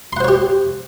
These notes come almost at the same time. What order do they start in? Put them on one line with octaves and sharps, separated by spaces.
C6 F#5 C5 C#5 G4